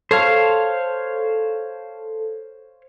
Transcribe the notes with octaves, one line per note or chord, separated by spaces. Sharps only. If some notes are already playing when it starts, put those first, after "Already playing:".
A4 C5 C#5 F5